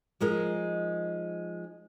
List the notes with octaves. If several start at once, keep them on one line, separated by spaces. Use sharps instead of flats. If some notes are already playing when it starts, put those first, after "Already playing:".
F3 G#3 D#4 A#4